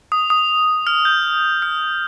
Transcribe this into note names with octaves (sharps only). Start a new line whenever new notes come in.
D#6
D#6
F6
G6
F6